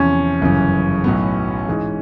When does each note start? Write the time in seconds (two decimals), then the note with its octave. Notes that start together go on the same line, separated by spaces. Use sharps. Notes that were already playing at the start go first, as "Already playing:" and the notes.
Already playing: E2 C3 F3 C#4
0.41 G1 F#2 C#3 E3
1.04 B1 A2 F#3 B3
1.68 G#2 E3 G#3